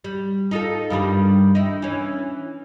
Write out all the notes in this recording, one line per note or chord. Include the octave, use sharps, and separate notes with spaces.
G3
D#4 F4 A4
G2 D#3 G3
D#4 E4
E3 C#4